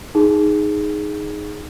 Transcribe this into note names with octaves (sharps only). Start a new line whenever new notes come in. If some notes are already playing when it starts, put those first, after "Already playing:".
D#4 G#4